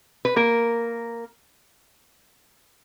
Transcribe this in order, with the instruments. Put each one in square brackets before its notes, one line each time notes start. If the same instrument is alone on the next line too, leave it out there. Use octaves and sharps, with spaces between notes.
[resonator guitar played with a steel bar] B4
A#3 A#4